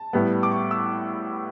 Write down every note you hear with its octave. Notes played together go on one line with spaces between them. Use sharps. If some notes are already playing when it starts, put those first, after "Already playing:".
Already playing: A5
A2 G3 B3
D6
C#6
E6